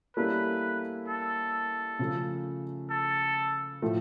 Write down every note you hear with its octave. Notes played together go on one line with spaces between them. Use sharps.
G3 A#3 C#4 E4 A4 B4
A4
C#3 F3 A3
A4
A2 F3 A3